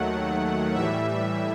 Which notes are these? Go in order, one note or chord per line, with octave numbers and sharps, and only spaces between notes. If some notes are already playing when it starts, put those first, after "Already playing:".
Already playing: D#2 D#3 F#3 A3 F#5
A2 E3 G3 E5